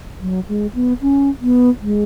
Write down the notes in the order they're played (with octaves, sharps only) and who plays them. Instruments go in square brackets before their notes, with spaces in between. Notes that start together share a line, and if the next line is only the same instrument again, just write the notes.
[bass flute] F#3
G#3
B3
C#4
B3
G#3